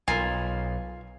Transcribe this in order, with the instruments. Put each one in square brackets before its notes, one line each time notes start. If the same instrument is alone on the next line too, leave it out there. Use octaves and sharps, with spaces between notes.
[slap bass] B1 [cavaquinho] F4 [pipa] A#4 G#5